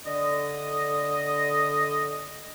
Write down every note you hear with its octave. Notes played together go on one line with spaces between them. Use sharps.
D3 D#5